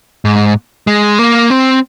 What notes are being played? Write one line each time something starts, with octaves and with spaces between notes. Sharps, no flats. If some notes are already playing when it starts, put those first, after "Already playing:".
G#2
G#3
A#3
C4